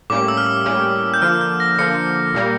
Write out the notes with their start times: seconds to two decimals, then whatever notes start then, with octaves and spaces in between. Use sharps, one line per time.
0.10 A2 G3 A#3 C#4 G4 D6
0.28 E6
0.37 F6
0.46 E6
0.66 A2 G3 A#3 C#4 G4
1.14 G6
1.22 D3 F3 A#3 F6
1.41 G6
1.60 A#6
1.78 D3 F3 A#3 C#7
2.34 A#2 G3 A#3